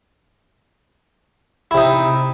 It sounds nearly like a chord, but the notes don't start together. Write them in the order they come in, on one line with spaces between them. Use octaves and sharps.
E4 C3 D#4